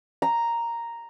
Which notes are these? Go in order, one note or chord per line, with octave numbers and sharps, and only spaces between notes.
A#5